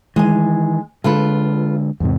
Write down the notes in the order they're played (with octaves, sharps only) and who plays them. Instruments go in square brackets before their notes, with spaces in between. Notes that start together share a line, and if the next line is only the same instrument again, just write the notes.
[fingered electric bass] D#3 E3 [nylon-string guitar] G#3 G#5
[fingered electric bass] D3 G#3 [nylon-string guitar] F4 A4 B4
[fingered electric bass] E2 G#2 C3